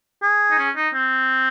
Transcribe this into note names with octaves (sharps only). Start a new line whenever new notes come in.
G#4
D#4
C#4
D#4
C4